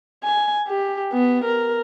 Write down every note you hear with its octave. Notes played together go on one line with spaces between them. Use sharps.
G#5
G4
B3
A#4